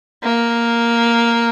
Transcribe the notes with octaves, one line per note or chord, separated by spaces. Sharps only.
A#3